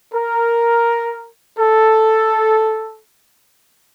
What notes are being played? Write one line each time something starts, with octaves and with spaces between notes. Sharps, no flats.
A#4
A4